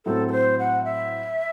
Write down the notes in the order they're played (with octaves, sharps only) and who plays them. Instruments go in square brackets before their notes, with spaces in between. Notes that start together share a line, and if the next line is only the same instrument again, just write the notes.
[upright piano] A2 F#3 C4 [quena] A4
[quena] A4
C5
F#5
E5